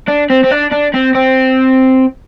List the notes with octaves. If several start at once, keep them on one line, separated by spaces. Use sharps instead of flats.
D4
C4
C4
D4
D4
C4
C4